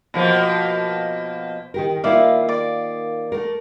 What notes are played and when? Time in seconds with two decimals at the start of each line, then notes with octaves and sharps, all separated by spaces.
0.14 B2 F3 A#3
1.74 D#3 G4 A#4
2.04 D#3 A#3 E4 F4 D5 F5
2.49 D5
3.32 A3 A#4